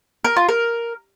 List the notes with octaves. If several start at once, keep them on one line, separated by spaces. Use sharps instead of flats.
A#4
F4
A#4